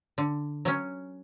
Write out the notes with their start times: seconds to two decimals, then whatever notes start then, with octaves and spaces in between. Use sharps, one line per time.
0.18 D3
0.65 F#3 C#4